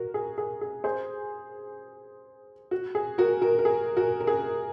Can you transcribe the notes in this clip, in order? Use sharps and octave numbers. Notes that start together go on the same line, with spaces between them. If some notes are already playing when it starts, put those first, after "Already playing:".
Already playing: F#4 A#4
G#4
G#4
G#4
G#4 C5
F#4
G#4
F#4 A#4
F#4 A#4
A#4
G#4
F#4 A#4
A#4
G#4